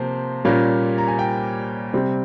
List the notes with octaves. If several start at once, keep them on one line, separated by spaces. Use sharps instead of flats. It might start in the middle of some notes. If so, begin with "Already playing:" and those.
Already playing: C3 F3 A#3 C5
A#2 G3 A#3 C#4
A#5
G#5
G5
C3 G3 C4